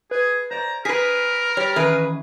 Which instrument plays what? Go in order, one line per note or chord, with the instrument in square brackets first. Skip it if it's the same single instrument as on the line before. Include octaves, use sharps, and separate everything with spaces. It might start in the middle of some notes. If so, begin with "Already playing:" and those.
[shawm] G#4 [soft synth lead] B4
[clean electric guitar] C5 D5 [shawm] A#5
[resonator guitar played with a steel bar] G#4 B4 [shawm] A#4 [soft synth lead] B6
[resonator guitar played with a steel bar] G3 [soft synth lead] C#5
[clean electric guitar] D#3 E3 C#4 [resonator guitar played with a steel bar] G#4 B4 [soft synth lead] E5